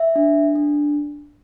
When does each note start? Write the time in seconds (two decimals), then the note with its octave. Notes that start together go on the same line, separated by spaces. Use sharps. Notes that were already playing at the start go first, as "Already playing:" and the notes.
Already playing: E5
0.16 D4
0.56 D4